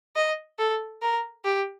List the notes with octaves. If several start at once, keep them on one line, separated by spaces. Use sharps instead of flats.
D#5
A4
A#4
G4